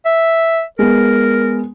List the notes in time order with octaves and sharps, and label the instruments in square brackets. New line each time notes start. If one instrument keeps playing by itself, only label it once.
[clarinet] E5
[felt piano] G#3 B3 [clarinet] A#4